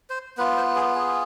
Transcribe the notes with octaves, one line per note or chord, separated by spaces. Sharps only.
C5
B3 F4 B4
C5
G#4
G#4